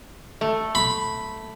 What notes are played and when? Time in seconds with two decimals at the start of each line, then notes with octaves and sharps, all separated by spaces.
0.41 A3
0.75 B5